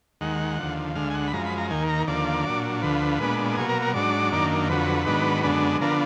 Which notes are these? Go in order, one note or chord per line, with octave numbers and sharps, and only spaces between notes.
D#2 D#3 G#3 F#5
D#2 D3 F3
D2 D3 G#3 F5
G#5
F#5
B5
F#2 F3 G#3 A#5
B5
A#5
D#2 D#3 A#3 G#5
A#5
D#2 D3 F3 A#3 D5
A#2 F#3 D4
D2 D3 F3 B4
A#2 G#3 B3 D4
B2 F#3 A#3 G#4
A#4
A#4
G#2 F#3 D4 D5
F#2 D#3 A#3 D4
F2 D3 F#3 B4
G#2 D#3 F#3 B3 D4
F#2 D3 G#3 B3 D4
D3 F3 B3 D4 A#4